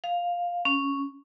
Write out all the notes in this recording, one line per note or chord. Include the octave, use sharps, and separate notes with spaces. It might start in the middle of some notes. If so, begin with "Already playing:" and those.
F5
C#4